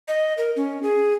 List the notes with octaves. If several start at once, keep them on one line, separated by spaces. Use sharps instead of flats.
D#5
A#4
C#4
G#4